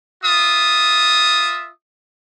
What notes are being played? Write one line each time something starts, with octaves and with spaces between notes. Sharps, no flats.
F4 E5 D#6